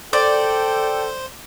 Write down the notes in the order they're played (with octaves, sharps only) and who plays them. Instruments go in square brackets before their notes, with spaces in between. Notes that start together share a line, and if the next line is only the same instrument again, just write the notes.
[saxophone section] A4 [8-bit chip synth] C5 [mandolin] D5 [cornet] G5